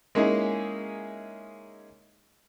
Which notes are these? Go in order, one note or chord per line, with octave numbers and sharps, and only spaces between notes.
G#3 A#3 C#4 D#4 E4 G#4